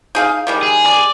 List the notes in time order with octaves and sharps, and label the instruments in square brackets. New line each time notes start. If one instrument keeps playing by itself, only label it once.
[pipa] D#4 G#4 F5
D#3 G3 G#3
[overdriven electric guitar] G#4
[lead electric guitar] D5